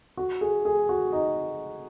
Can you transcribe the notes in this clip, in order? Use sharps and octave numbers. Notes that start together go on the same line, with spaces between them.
F#4
G#4
G#4
F#4
D#4